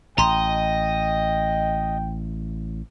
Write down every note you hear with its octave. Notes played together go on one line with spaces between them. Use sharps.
A1 D#5 G5 A#5 C6